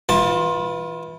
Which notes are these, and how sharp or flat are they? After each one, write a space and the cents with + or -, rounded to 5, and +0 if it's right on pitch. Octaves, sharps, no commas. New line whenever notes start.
E3 -15 F4 +20 A5 +0